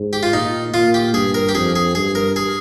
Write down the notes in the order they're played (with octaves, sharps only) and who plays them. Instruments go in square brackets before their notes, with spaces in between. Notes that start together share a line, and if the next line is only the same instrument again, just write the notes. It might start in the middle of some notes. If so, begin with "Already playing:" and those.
Already playing: [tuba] G#2
[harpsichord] G4
F4
[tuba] A#2 [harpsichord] D#4
[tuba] A#2 [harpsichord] F4
[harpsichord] G4
[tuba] G2 [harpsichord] G#4
[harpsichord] A#4
G4
[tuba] F2 [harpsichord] G#4
[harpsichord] G#4
[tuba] G2 [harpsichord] G#4
[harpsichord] A#4
G#4